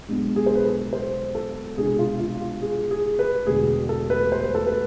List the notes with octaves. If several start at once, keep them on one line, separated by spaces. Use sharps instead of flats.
B1 B2 G#3 D4
G#4
C5
B4
A4
C5
A4
C2 B2 G#3 D4 G#4
F4
F4
F4
G#4
G#4
B4
E1 D2 D3 G#4
A4
B4
C5
B4
A4
B4